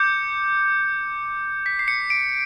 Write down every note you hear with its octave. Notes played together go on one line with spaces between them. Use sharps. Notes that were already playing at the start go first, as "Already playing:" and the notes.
Already playing: D6 G6 C#7
B6
C7
C#7
D7